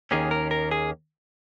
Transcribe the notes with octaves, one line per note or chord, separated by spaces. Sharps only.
D#2 D#3 A#3 C#4 G#4
A#4
A#4
G#4